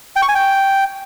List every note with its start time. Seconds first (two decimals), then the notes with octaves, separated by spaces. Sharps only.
0.16 G5
0.22 C#6
0.29 G#5
0.35 G5